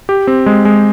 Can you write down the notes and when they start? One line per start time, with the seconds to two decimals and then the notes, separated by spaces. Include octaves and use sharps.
0.09 G4
0.27 C4
0.46 G#3
0.65 G#3